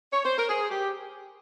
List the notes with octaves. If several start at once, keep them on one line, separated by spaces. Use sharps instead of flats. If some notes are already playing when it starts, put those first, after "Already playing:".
C#5
C5
A#4
G#4
G4